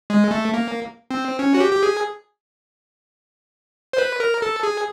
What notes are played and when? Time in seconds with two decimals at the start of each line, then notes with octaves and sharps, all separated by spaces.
0.10 G#3
0.31 A3
0.54 A#3
1.11 C4
1.39 C#4
1.54 F#4
1.60 G4
1.72 G4
1.83 G#4
3.93 C5
3.98 B4
4.20 A#4
4.42 A4
4.63 G#4